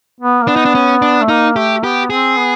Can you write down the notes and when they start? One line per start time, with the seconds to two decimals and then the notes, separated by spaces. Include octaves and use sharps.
0.20 B3
0.42 A#3
0.48 B3 D4
0.56 D#4
0.65 D4
0.75 C#4
1.02 D4
1.21 A3
1.29 A#3 D#4
1.56 A3 G4
1.83 B3 G4
2.10 C4 G#4
2.38 B3